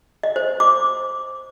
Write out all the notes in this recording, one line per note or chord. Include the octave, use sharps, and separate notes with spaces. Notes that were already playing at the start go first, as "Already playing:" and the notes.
D#5
C5
D6